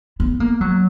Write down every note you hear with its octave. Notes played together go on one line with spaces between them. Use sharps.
B3
A#3
F#3